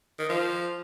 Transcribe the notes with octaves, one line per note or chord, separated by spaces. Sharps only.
D#3
F3